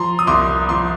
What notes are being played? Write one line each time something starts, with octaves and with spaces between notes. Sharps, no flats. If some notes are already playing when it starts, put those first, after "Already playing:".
Already playing: F3 A#5 C6
D#6
C2 C6 D6
F3 C6 D6